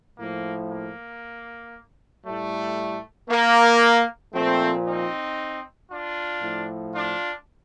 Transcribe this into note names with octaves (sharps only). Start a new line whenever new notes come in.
A2 F3 A#3
A#3
A2 G3 A3
A#3
A#2 F3 A3 C4
C4 D#4
D4 F4
A2 F3
D4 F4